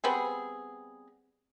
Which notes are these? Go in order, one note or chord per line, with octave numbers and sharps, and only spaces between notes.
G3 B3 C4 G#4